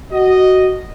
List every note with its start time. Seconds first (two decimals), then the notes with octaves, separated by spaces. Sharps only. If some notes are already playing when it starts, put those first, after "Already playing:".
0.12 F#4 D#5